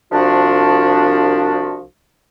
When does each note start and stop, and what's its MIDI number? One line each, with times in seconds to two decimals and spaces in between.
0.12 1.82 36
0.12 1.82 53
0.12 1.82 62
0.12 1.82 66